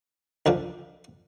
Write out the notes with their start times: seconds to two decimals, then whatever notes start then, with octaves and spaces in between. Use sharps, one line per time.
0.46 D2 D3 F3